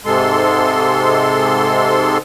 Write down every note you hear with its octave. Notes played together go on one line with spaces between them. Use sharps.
G#2 C3 G#3 A4 C6